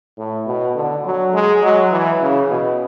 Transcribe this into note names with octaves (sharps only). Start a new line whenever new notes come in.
A2
B2
D3
F#3
G#3
F#3
E3
C#3
B2